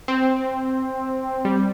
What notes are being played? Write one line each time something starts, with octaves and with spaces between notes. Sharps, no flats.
C4
G3